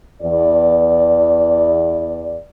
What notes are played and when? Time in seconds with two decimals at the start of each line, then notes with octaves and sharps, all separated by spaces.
0.22 E2 D5